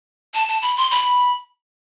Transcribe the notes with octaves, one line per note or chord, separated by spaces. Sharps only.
A5
A5
B5
C6
B5